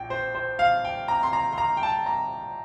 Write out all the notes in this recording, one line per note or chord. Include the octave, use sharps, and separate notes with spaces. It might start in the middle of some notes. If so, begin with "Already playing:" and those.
Already playing: A#1 G5
C5
C5
F5
G5
A#5
C6
A#5
C6
A#5
G5
A5
A#5